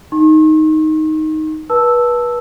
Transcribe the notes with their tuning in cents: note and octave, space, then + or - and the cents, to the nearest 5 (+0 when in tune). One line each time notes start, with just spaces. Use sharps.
D#4 +5 C#6 -45
B4 -30 A5 +0 E6 +0